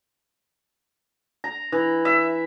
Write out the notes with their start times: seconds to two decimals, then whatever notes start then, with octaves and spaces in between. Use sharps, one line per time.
1.44 A#5
1.72 E3
2.05 E5